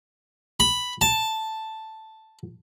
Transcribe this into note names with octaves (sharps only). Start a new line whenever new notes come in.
B5
A5